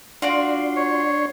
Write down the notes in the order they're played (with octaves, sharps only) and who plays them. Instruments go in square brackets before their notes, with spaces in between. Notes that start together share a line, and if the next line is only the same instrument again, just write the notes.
[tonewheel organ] D4 C6 [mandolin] F4 F#4 D5
[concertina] C#5